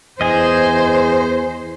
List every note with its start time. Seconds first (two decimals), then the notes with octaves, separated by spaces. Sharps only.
0.21 E2 G#4 C5 D#5